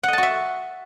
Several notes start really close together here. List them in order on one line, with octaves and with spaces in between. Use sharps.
F#5 D#5 A5 F#4 E5